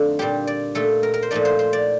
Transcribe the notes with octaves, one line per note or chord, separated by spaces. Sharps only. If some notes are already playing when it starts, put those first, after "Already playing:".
Already playing: F2 D3 A3 D#4 F4
A#2 G3 D4 G4
D5
A#2 A3 D#4 A4
A#4
A#4
C5
A#2 F3 A3 D#4 D5
C5
C5
D5